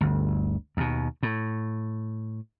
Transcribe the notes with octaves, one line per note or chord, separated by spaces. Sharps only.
G1 D2
D#2 B2
A2